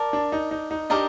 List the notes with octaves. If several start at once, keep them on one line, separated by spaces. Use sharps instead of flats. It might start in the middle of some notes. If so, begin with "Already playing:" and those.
Already playing: A#4 D5 A5
D4
D#4
D#4
D#4
D4 D#4 G4 A#4 D#5